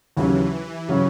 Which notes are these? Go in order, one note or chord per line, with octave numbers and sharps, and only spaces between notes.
D#2 C#3 E3 F#3 C#4
C#3 F#3 C#4